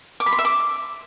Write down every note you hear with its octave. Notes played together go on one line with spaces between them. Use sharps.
D6
B5
C6
E5
D6